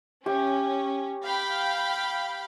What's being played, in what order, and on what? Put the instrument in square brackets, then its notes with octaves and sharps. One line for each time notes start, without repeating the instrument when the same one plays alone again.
[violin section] C#4 [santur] G4
[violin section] F5 G5 B5